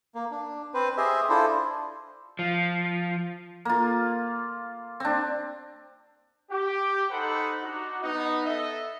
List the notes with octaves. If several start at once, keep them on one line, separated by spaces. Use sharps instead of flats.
A#3
D4
C4 B4 C5
G4 G#4 C5 D#5 E5
D4 E4 F4 A4 C5
F3
A#3 F4
C4 D4
G4
D#4 A4 C5 F#5 B5
D4 D#4 F#4
B3 D#4
A4 D#5 E5